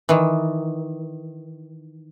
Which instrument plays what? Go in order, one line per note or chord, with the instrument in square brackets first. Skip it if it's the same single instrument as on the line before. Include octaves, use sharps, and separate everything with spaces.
[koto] D#3 E3